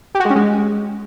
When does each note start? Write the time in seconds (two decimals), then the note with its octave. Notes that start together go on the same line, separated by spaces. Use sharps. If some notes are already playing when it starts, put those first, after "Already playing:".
0.15 G4
0.20 F#4
0.25 G#3
0.30 C#4
0.36 G#3